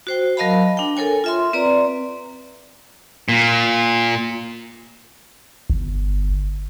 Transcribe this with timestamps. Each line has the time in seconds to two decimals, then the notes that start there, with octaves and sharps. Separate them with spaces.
0.07 F#4 C5 G5
0.37 F#3 A#4 D#5 F5 A5 B5
0.77 D4 G5
0.97 A4 A#4 C#5 G#5
1.24 F4 E5 C6
1.53 C4 B4 D5 A#5
3.29 A#2
5.70 G1